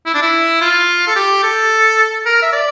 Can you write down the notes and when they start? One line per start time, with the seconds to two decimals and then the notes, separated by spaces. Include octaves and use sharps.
0.06 E4
0.14 D4
0.22 E4
0.61 F4
1.07 A4
1.16 G4
1.43 A4
2.26 A#4
2.42 E5
2.53 D5